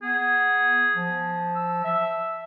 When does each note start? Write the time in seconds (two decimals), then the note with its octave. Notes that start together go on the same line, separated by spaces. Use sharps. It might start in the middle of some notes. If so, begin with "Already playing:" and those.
0.03 B3 G#4
0.95 F3
1.56 E6
1.84 E5